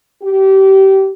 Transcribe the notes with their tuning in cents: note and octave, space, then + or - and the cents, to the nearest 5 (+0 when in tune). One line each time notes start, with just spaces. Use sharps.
G4 -25